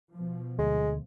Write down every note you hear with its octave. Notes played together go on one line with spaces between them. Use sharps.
B2 F3
D2 G#3